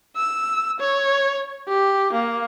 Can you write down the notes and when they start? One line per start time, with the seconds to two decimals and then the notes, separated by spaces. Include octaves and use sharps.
0.17 E6
0.80 C#5
1.68 G4
2.13 A#3